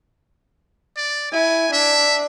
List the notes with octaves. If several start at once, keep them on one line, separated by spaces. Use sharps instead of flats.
D5
E4 G#5
D4 E5